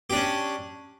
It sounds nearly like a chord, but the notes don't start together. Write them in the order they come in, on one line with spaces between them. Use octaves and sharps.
G4 D4 C#4